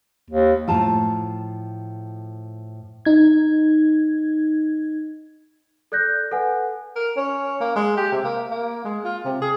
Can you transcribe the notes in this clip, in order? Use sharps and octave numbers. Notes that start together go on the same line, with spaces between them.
D#2
A2 F3 F4 A5 A#5
D#4 G#6
A4 D5 F#6 G6 A#6
A4 B4 F#5 G#5
A#4
C#4
A#3
G#3
G4
C3
A#3
A#3
G#3
F4
C3
G#4